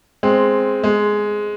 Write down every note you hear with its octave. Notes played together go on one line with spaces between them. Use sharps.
G#3 C4
G#3